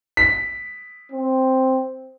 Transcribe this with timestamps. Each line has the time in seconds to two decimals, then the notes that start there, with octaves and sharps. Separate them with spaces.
0.17 B6
1.12 C4